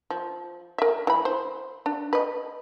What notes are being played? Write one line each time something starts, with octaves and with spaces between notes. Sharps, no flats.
F3
A#4 E5
E3 B5
C5
D4
B4 D#5